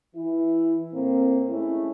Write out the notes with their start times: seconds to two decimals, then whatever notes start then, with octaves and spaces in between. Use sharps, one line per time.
0.16 E3 E4
0.94 A2 A#3 C4
1.49 G#3 A3 C#4 E4